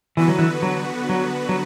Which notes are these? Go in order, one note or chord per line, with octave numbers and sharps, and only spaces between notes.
D3 E3 B3 F#4 B4
F#3
E3
F#3
F#3
F#3